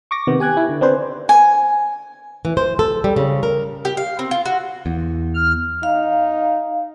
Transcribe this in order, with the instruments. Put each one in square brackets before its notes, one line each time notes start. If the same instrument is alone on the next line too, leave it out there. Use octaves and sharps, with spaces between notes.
[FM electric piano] C#6 D6 A#6
C3 D#3 B3
G4 G#5 F#6 G#6
E4
D3
C4 D4 B4 C5
[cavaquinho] G#5
[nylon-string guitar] E3
C5
A4
G3
C#3
A#4
[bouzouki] G4
F5
C4
F4
F#4
[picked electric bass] E2
[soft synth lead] F6
[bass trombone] D#4 [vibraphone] F5